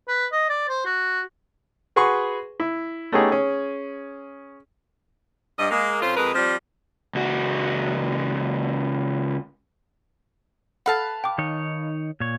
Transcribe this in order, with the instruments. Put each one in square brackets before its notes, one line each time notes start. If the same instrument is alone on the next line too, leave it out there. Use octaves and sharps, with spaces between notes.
[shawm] B4
D#5
D5
C5
F#4
[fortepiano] F#4 G#4 B4 C6 C#6
E4
A3 B3 C#4 D#4 G4 G#4
C#4 G#4
[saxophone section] G2 D#5
G#3 A#3
F2 C#4 F4 A4 C5
F2 G#3 A#4 B4
F3 G3 C4
[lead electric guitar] C#2 F#4
[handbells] A4 F#5 [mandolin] B4 F5 A5
[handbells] G5 D6
[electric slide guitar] D#3 D#4 C#5
A#2 C#5